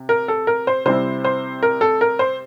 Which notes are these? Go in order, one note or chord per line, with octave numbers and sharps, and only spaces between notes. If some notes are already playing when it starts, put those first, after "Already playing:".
Already playing: C3
A#4
A4
A#4
C5
C3 G3 C4 E4 C5
C5
A#4
A4
A#4
C5